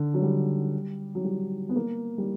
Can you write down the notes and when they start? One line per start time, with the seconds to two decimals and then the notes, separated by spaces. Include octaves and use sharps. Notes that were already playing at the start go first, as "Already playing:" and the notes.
Already playing: D3
0.14 F#3
0.22 G3
1.15 F#3
1.24 G3
1.69 B3
1.76 A#3
2.18 G3